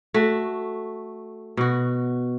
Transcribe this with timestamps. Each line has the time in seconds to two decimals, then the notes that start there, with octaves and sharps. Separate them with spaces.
0.14 A3 F#4
1.57 B2 F#4